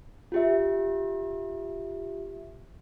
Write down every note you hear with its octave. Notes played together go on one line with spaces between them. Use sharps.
F4 G4 E5